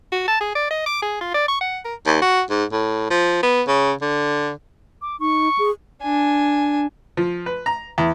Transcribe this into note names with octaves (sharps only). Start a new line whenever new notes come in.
F#4
A5
G#4
D5
D#5
D6
G#4
F4
D5
C#6
F#5
A#4
D#2
F#4
G#2
A2
F3
B3
C#3
D3
D6
D#4 C#6
G#4
D4 G#5
F3
B4
A#5
E2